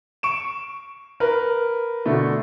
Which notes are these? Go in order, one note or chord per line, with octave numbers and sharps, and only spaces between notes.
C#6 D7 E7
A#4 B4
B2 D3 A3